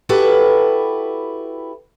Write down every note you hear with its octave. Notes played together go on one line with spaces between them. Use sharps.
E4 F#4 G4 A4 B4